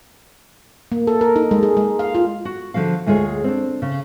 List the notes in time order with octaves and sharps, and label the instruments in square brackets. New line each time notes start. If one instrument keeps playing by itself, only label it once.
[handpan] A#3
A4
A#4
D#4
G#3
G#4
G#3
F5
F4
[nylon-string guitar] F#4
D3 F3 F#4 F5
D2 G#3 F4 G#4 C#5
C4 D4
C#3